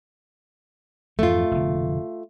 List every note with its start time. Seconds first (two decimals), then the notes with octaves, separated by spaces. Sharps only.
1.19 F2 G#2 E3 A3 F4
1.51 F1 B2 D3